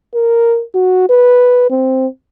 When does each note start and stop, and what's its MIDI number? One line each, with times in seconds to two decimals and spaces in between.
0.14 0.62 70
0.75 1.06 66
1.09 1.67 71
1.70 2.07 60